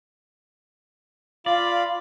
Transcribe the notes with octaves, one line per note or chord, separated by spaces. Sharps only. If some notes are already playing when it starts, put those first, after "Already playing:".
F4 D5 F5 B5